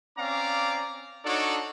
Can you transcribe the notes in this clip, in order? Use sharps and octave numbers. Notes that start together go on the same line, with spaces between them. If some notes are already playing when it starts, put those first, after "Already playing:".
C4 C#4 D5 F5 A#5 D6
D4 D#4 F#4 A4 C#5 D5